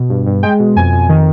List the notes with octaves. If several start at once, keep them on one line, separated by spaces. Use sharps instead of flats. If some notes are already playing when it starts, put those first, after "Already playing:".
Already playing: B2
G2
G2
G#3 G5
B2
F2 G#5
F2
D#3